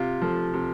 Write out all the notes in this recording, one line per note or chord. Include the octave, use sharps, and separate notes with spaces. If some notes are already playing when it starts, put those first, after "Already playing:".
Already playing: C3 F4
F3 A3
C3